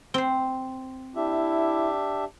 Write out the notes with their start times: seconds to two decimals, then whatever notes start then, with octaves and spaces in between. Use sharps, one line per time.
0.14 C4 C5
1.16 D4 E4 G4 E5